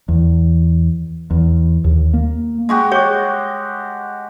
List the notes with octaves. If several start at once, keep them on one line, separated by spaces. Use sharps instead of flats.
E2
E2
D#2
A#3
G#3 F#4 G4
G#4 C#5 C#6